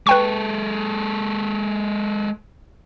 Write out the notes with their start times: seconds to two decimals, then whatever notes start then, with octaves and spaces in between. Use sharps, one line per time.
0.07 G#3 A4 B4 G5 C#6